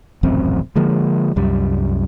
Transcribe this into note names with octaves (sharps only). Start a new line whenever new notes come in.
D#1 A1 F#2 C4
D3 F3 G#3 A#3
C2 F#2 G3